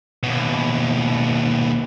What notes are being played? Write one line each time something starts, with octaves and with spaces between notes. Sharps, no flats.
D#2 B2